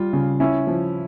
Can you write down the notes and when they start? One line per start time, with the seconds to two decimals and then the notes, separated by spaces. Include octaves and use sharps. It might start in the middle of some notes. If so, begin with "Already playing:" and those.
Already playing: G3 F4
0.13 C#3
0.40 C#4 E4
0.67 F3